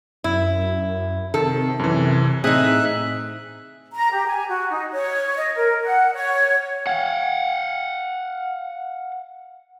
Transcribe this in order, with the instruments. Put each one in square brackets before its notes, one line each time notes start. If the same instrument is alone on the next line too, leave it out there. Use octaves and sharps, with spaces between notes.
[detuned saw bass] F#2 [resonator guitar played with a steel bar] E4
[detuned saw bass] C3 [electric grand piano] D#3 [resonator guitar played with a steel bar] A4
[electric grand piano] F#2 E3
[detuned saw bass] A2 [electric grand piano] C4 [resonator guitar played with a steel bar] D#4 G#4 [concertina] E5 F#6
[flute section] A#5
G4
G#5
F#4
D#4
C#5
D#5
A#4
F#5
C#5
[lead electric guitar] F5 F#5